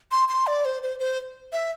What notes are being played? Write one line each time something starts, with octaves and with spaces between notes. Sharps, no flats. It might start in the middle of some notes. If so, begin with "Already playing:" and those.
C6
C6
D5
C5
C5
C5
E5